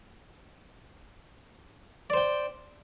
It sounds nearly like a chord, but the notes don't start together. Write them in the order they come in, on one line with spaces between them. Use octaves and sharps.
D5 C5 G5